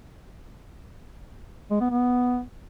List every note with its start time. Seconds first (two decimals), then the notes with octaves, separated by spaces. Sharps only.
1.70 G#3
1.81 B3
1.91 B3